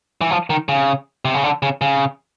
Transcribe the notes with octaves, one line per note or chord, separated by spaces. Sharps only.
E3
F3
D#3
C#3
C3
C#3
D3
C#3
C#3